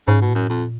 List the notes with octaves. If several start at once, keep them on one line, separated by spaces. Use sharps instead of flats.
G#2 C#3
B2
A2
F#2
F2 A#2